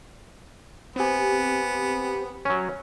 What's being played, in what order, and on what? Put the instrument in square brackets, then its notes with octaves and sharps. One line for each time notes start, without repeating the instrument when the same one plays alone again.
[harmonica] B3 [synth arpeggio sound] C4 G4 [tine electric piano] C5 G#5
[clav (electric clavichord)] F#3 C#4